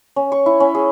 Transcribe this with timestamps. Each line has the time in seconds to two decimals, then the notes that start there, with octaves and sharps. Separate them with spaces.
0.16 C#4
0.32 C#6
0.46 E4
0.60 C#4
0.75 G#4